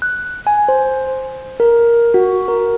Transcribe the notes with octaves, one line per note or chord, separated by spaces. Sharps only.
F#6
G#5
C5
A#4
F#4
A#4